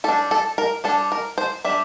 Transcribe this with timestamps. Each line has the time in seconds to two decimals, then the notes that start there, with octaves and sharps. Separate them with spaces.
0.04 G3 A4
0.09 D4
0.31 A4
0.58 A#4
0.84 G3 D4 A4
1.12 A#4
1.38 C5
1.65 G3 D4 E5